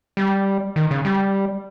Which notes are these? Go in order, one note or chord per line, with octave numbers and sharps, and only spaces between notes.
G3
D#3
C#3
G3